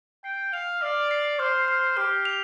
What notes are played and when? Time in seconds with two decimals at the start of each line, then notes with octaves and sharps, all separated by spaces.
0.24 G5 C7
0.53 F5 F7
0.81 D5 F6
1.11 C7
1.39 C5 F6
1.68 F6
1.97 G4 F6
2.25 F7